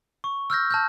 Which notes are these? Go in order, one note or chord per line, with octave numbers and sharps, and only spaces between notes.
C#6
E6 F6 G6 A#6
A5 F6 G6